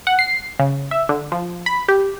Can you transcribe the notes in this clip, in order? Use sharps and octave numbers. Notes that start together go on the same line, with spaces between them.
F#5
C7
C#3
E5
D3
F3
B5
G4